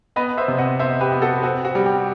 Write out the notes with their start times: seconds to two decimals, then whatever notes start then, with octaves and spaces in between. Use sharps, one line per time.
0.16 B3 B4 D#5
0.38 C5 E5
0.48 C3
0.58 D#5 F#5
0.79 B3 C5 E5
1.01 G4 B4
1.12 B3
1.22 F#4 A4
1.43 C4 F#4
1.65 F#4
1.75 G3
1.86 G4